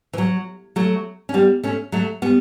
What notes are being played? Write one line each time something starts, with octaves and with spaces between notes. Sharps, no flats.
E3
F#3
F#3 A3
C#4
G3 B3
A3 C#4
F#3 A3
G3 B3